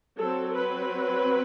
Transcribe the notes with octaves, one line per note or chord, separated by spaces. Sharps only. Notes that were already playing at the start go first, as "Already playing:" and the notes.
F#3 C4 A4
B4